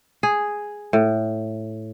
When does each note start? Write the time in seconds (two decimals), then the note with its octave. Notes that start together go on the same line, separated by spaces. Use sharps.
0.23 G#4
0.93 A2